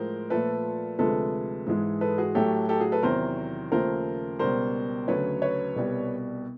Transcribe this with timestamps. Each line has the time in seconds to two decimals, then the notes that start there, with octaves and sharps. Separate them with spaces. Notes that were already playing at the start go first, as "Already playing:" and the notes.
Already playing: A2 F3 G#3 A#4 C5
0.30 A#2 F3 A3 A4 B4
0.99 D2 C3 F3 G#3 A4 B4
1.66 G#2 E3 G#3
2.01 A4 B4
2.18 F#4 G#4
2.35 A2 F#3 A3 G4 A4
2.69 G4 A4
2.80 F#4 G#4
2.92 A4 B4
3.03 E2 C3 D#3 F#3 A#4 C5
3.72 D#2 C#3 F3 A3 A#4 C5
4.39 C#2 B2 G3 A#4 C5
5.08 D2 C#3 F#3 B4 C#5
5.42 B4 C#5
5.76 C2 B2 G3